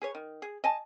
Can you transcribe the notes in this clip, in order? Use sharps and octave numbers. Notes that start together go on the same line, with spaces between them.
G#4 B4 C#5
D#3
G#4
D#5 G#5 A5